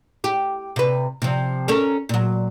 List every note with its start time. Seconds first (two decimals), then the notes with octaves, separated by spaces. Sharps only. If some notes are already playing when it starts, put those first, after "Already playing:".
0.24 G4
0.76 C3 B4
1.22 C3 F3
1.68 C#4 A4 A#4
2.09 A#2 F#3